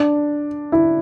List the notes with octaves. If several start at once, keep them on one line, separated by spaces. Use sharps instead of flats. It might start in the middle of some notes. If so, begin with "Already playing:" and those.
Already playing: D4
E4